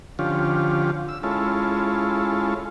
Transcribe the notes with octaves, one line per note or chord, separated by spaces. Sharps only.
D3 F3 C#4 F4 G4
E6
G#3 C#4 E4 F4 A4